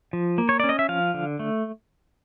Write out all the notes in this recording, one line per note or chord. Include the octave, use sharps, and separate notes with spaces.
F3
A#3
C#5
C#4 D5
D#5
E5
F3 F5
D3
A3